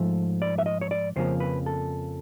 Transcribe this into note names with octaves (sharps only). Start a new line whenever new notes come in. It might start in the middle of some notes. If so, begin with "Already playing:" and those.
Already playing: G#2 F3 A3
D5
E5
D#5
C#5
D5
F2 C#3 F3 A#3 C5
B4
A4